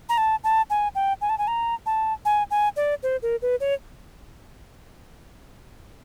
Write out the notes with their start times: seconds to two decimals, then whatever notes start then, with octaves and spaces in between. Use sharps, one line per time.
0.09 A#5
0.18 A5
0.44 A5
0.70 G#5
0.95 G5
1.21 G#5
1.29 A5
1.38 G#5
1.48 A#5
1.86 A5
2.25 G#5
2.51 G#5
2.76 D5
3.03 C5
3.22 A#4
3.42 B4
3.60 C#5